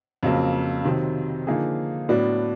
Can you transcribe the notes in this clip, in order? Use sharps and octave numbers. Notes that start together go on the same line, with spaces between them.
F2 C#3 F#3 A#3
C3 D#3 F#3
D3 F3 A#3 D#4 G#4
A2 F#3 B3 D4 F#4